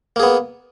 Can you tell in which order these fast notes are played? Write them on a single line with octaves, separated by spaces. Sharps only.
A#3 G#4 B3